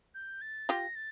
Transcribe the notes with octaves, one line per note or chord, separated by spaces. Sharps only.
G6
A6
F4 G4 A#6
A6